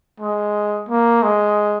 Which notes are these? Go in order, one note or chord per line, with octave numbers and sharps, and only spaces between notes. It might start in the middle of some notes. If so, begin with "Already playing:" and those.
G#3
A#3
G#3